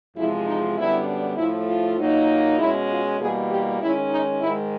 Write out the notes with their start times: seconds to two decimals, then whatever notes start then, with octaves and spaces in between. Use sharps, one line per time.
0.16 E2 C3 F3 G#3 E4
0.46 D#4
0.76 F#2 D3 G3 B3 D4 E4
1.37 A2 F3 A3 E4
1.68 F4
1.98 A#2 F#3 A#3 D#4
2.58 B2 G#3 C#4 E4
2.90 F4
3.19 E2 B2 G3 A#3 G#4
3.50 G4
3.81 D#3 G#3 C#4 E4
4.11 D#4
4.41 G#2 D#3 G#3 E4